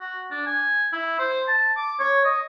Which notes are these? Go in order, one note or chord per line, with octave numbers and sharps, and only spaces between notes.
F#4
D4
G#5
E4
C5
A5
D6
C#5
D#5